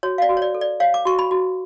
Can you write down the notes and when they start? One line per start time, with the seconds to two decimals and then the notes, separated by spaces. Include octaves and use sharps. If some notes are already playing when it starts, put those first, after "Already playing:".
0.03 F#4 C#5
0.18 F5
0.22 D5
0.29 F#4
0.37 C#5
0.42 D5
0.55 A4
0.61 D5
0.80 C#5 F5
0.94 D6
1.05 F#4 C#6
1.19 B5
1.31 F#4